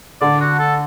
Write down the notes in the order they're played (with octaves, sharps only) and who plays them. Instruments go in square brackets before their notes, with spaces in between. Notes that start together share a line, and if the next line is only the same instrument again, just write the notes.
[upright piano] D3 [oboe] D5
[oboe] F#4
A4